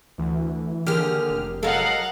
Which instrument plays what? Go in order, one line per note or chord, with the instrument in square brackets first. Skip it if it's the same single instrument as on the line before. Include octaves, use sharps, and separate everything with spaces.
[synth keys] D2 [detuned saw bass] E3
[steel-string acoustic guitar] D#2 G#4 [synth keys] D3 G4 F6
[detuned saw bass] F1
[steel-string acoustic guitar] F#3 G#3 [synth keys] A4 A#4 D#5 [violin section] F5 F#5